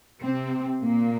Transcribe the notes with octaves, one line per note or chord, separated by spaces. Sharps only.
C3 C4
A#2 A#3